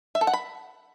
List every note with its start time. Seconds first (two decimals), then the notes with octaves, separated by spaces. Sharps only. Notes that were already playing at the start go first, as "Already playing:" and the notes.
0.15 E5
0.21 A4
0.27 F#5
0.33 B5